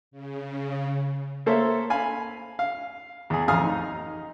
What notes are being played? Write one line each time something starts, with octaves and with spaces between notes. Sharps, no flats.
C#3
A#3 A4 C5 C#5 E5
F5 G#5 B5
F5
E2 G#4
A1 F2 F5 G#5 D#6 F6
D#4